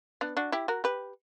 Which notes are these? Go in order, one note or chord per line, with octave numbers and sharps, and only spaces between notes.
B3 D4
D4 F#4
E4 G4
F#4 A#4
G4 B4